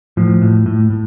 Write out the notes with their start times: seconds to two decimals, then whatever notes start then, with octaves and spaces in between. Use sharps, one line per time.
0.17 A2 F3
0.42 A2
0.66 A2
0.90 A2